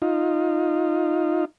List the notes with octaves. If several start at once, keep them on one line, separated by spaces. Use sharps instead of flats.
D#4 F4